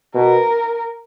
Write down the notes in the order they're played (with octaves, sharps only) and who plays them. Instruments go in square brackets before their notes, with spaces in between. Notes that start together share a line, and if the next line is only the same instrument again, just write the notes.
[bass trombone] B2 [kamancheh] A#4